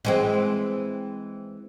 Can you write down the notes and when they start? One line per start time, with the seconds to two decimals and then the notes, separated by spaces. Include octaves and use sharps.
0.05 E3 G#3 C4